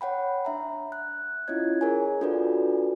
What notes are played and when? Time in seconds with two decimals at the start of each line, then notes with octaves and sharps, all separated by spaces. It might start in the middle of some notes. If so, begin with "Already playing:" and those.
0.01 C#5 F#5 G5 B5
0.45 D4 E5 A#5
0.92 F#6
1.48 C#4 E4 F4 C#5 D#5 G#6
1.81 G#4 A#4 C#5 G#5
2.21 D4 F4 F#4 A4 B4 D5